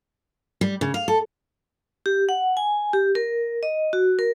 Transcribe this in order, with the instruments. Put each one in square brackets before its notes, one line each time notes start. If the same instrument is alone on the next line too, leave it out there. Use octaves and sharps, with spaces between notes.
[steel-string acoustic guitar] G3
C#3
F5
A4
[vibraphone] G4
F#5
G#5
G4
A#4
D#5
F#4
A#4